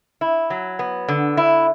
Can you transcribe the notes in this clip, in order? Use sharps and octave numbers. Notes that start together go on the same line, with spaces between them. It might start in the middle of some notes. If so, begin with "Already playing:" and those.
E4
F#3
B3
D3
E4